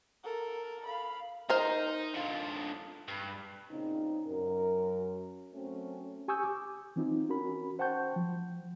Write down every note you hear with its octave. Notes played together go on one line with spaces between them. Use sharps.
A4 A#4
F5 B5
D#4 A#4 C5
D3 F4
G2
A#2 C#3 C4 C#4 D#4
F#2 A#4
F#3 A3 C4 C#4
G4 G#5 C#6 D#6 E6 G6
D6
E3 C4 D#4 F4
C#4 F#4 A#4 B5
C5 F#5 G5 A5 C#6 G6
F3